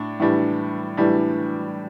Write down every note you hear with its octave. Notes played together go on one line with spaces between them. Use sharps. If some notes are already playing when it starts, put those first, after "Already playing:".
Already playing: A2 D4
A2 E3 G3 D4
A2 E3 G3 D4